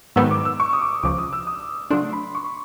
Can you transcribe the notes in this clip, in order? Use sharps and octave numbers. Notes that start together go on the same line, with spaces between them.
G#2 D#3 F#3 B3 E6
D6
E6
C#6
D#6
D6
C#2 C#3 F3 D6
D#6
E6
D#6
C#3 F#3 A3 D4 C6
B5
C#6